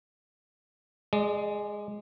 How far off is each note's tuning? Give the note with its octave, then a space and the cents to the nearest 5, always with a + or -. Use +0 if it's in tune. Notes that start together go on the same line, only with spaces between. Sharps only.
G#3 +0 D5 +35